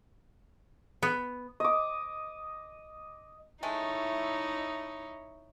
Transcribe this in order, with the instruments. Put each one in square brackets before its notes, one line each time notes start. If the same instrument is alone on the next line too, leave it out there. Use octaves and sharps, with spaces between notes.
[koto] B3
[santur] D#5 D6
[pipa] G#3 A3 [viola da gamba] D#4 E4 C#5